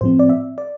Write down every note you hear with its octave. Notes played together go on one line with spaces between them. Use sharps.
A2 F3 C4 C5
D5
E5
D5